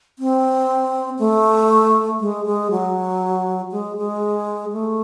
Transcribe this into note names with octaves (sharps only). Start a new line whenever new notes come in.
C4
A3
G#3
G#3
F#3
G#3
G#3
A3